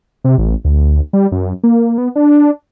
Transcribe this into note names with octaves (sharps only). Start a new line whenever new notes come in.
C3
A1
D2
G3
F#2
A#3
B3
D4